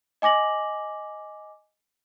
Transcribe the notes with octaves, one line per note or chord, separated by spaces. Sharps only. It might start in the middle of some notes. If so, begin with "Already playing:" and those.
D#5 G#5 D6 A#6 F#7